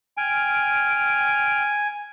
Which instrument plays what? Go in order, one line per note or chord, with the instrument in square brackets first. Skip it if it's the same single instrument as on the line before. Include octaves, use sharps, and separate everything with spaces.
[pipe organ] G5 F6 [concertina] G#5